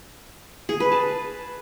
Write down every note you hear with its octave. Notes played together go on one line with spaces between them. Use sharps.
G#4
B4
A5